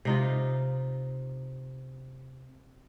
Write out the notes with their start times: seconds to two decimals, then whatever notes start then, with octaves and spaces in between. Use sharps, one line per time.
0.05 C3 D#4 F4